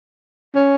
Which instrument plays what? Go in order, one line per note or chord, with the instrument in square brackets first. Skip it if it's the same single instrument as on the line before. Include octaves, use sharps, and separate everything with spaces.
[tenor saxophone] C#4